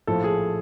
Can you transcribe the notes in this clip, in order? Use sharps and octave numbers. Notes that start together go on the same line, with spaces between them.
A#1 A2 F3 A4
G#4